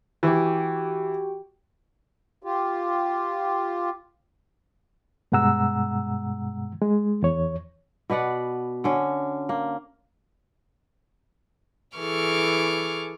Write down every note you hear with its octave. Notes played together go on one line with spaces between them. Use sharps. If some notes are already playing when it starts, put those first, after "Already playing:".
E3 F#4 G4 G5
F4 G4
G2 B2 G#3 F#5 A#5 E6
G#3
E2 C#5
B2 B4 D5 F#5
D3 C#4
A#3
E3 G#4 A4 C#6 D6 F6